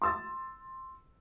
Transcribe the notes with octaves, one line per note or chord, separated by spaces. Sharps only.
C6 E6 A6